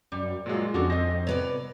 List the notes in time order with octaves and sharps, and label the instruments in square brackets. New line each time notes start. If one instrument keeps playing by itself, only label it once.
[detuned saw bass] F#2 [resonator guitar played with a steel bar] G3
[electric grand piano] A#2 F#3 G#3 [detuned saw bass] F4
[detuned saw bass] F2 [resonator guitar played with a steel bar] C#4 D4 A4 [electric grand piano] F#4
[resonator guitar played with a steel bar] C4 D#5 [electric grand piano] A#6
[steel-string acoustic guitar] C3 B3 D5 [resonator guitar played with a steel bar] C#5